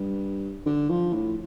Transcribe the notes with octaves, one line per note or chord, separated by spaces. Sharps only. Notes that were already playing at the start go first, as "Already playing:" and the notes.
Already playing: G2
D3
F3
A2